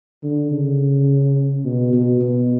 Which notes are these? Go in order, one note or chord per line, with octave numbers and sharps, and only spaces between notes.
D3
C#3
B2
B2
B2